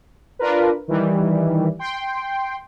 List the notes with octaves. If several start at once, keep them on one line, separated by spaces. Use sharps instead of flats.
D4 F4 A#4 B4
D#3 E3 G3
G5 C6